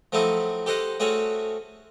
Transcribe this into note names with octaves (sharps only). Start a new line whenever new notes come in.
F3 F#3 A3 C4 D#4 E4
G4 A4 C5 D#5 F#5
A3 C4 C#4 F#4 G#4 C#5